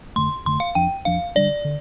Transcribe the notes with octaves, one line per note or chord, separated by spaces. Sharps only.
F2 D3 A3 C6
F2 D3 A3 C6
F5
F2 F3 D4 G5
F2 F3 D4 F5
D3 G3 D4 D5
D3